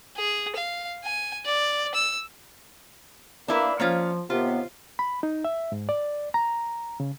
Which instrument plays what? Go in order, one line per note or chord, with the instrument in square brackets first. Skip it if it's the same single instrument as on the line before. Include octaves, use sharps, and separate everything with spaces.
[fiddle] G#4
F5
G#5
D5
E6
[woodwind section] A#3 [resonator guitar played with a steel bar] D4 E4 B4
[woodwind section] F3 [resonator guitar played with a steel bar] A#3 C#4 F4
[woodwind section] D#2 C3 B3 [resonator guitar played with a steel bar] F4
[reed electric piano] B5
D#4
E5
G#2
D5
A#5
C#3